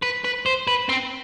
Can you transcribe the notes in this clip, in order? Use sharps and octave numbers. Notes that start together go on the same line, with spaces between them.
B4
B4
C5
B4
C4